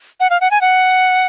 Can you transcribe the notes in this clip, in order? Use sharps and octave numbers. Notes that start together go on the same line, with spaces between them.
F#5
F5
F#5
G#5
F#5